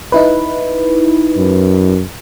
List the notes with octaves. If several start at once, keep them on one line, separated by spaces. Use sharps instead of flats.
D#4 E4 B4
F#2